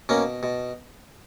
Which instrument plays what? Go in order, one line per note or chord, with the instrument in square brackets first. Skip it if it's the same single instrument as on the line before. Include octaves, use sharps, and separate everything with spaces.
[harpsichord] B2 A#3 C#4
B2